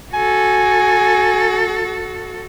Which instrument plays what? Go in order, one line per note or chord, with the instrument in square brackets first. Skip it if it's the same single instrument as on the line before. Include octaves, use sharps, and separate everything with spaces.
[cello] F#4 A4 [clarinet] G#5